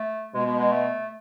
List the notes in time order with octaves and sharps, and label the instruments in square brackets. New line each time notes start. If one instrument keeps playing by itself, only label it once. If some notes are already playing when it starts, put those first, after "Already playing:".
Already playing: [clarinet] A3
[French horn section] B2 [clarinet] G#3
[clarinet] G#3
G#3
A3